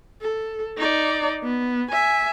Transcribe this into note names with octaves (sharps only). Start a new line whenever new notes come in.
A4
D#4 D5
B3
E5 G#5